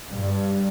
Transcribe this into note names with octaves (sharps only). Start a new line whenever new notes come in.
G2